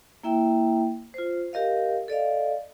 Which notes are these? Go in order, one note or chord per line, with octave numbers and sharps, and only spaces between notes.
A#3 E4 E5 G5
F4 C5
G4 A#4 D#5 F5
A4 D5 D#5 F5